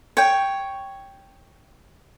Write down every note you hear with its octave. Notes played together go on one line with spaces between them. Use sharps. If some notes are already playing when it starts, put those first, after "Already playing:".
C#5 G5